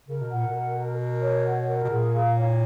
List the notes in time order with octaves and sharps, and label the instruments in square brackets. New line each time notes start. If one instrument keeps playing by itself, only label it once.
[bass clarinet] C#3 [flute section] A#4
[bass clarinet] B2
[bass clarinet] A#2 [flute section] F#5
[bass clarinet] B2
[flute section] A#4
A#4
A#4
C#5
F#5
A#4
[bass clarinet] B2
[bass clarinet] A#2 [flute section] G#4
[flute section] F5
C#5